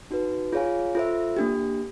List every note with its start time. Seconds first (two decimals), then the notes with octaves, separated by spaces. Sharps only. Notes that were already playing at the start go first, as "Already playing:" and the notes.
0.11 D#4 F#4 B4
0.53 F4 G#4 C#5 F5 G#5
0.95 F4 A4 C5 E5
1.37 A#3 D4 G4